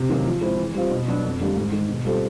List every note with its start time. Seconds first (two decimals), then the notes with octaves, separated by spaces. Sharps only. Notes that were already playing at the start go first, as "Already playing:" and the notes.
Already playing: C3
0.09 D#3 F#3 A#3 C#4
0.26 F3
0.41 G#3 C4 E4
0.58 E3
0.74 G3 C4 F4
0.91 B2
1.08 F#3 B3 D4
1.23 F2
1.40 D3 G3 A#3 D4
1.56 G#2
1.72 D#3 G#3
1.89 B2
2.05 G3 C4 F4 A4